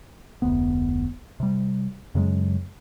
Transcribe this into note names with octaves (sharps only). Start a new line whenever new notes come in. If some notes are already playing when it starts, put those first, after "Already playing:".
F1 D2 B3
C3 G3
F#2 C#3 F#3 G#3